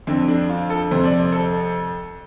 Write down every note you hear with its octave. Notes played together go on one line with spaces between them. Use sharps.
F2 D3 C4
D4
F4
A4
F2 C3 C5
D5
C5
A4